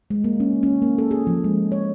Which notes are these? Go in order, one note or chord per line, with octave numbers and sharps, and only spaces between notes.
G#3
A#3
C#4
C#4
A#3
A4
G#4
F3
G#3
C#5